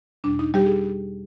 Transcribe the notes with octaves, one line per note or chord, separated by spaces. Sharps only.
E2 B2 G3 D4
D#4
G3 G4
G#4